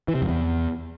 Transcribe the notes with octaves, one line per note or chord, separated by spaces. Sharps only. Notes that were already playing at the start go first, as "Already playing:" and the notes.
E3
C3
F2
E2